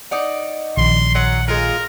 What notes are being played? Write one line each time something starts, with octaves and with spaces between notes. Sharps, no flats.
D#4 D5 F#5
A#1 D#3 C6
F#3 F#5
G#3 F4 A#4